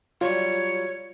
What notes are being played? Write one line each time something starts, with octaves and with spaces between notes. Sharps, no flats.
F#3 G3 F4 C#5